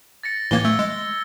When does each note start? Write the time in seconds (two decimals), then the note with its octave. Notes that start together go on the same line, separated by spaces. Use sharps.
0.23 A6 A#6 C#7
0.51 A2 E3 A#3 G#6 G7
0.65 A3 E6
0.79 G#3